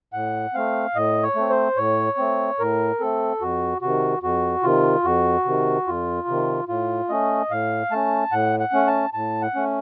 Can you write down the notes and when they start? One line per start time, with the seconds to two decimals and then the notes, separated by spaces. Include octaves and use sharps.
0.13 A2 F#5
0.54 A3 C4 F5
0.95 A2 D#5
1.23 C#5
1.36 A3 C4
1.50 C5
1.77 A2 C#5
2.18 A3 C4
2.59 A2 A#4
3.00 A3 C4 A4
3.41 F2 F#4
3.82 C3 D#3 F#4
4.23 F2 F#4
4.63 C3 D#3 F4
5.04 F2 F#4
5.45 C3 D#3
5.87 F2 F4
6.28 C3 D#3
6.68 A2 F4
7.09 A3 C#4 D#5
7.50 A2 F5
7.91 A3 C#4 A5
8.32 A2 F#5
8.60 F#5
8.73 A3 C#4
8.87 A5
9.14 A2 A5
9.42 F#5
9.55 A3 C#4